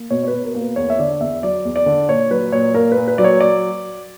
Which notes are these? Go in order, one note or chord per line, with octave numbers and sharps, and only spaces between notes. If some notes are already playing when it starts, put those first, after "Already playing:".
Already playing: A#3
B2 C#5
C#5
B4
B2
A#4
A#3
B4
E2 C#5
E5
D3 D5
E2 E5
F#3 D5
E2
D5
D3
A#2 C#5
F#3 B4
A#2 C#5
A#3 A#4
A#2 B4
B4
F#3 D5
C#5
D5